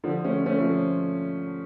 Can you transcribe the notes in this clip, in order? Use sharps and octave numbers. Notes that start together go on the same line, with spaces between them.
D3 F3
A3 C#4
A3 C#4
F3 A3